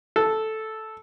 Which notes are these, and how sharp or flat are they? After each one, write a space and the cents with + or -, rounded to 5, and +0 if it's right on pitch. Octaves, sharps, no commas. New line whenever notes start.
A4 -5